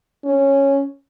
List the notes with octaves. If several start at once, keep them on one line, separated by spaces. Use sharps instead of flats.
C#4